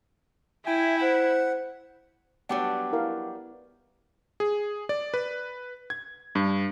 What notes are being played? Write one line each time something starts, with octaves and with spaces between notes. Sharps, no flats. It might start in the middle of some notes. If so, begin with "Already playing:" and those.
E4 E5 G5 G#5
C5 F#5
F#3 G3 B3 D4 F#5 G5 D6
E4 A#4 F5
G#4
D5
B4
G#6
G2